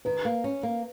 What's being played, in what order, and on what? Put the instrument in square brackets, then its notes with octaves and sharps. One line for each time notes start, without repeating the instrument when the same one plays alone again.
[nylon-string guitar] D#3 [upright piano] B4
[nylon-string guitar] A#3
C#4
A#3